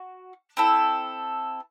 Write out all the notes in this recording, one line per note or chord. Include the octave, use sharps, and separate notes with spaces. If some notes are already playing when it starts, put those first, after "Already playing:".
Already playing: F#4
C4 E4 A4